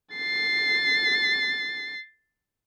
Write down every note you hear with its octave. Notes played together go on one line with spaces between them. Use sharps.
A6 C7